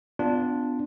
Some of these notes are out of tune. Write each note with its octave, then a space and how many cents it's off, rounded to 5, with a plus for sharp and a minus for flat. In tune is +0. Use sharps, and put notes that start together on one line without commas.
B3 +25 D4 +0 F4 +0